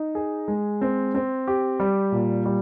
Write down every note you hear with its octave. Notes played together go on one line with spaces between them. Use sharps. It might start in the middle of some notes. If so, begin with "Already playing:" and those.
Already playing: D#4
G#4
G#3
C4
C4
G4
G3
A#2
G3